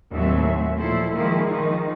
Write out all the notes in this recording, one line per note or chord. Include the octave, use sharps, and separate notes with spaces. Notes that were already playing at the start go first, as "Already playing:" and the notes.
D#2 A2 F#3 C4 E5
A#2 F3 E4 A4 C5
D#3 F3 G#3 A#3 E4
D#3 F3 D#4